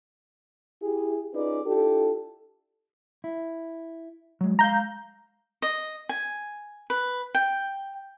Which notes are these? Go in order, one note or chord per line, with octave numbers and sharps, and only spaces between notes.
E4 G4 G#4
C#4 D#4 F4 G#4 B4 D5
D4 E4 F4 G4 A4
E4
F#3 G#3
G#3 E5 F5 A#5 G6
D#5
G#5
B4
G5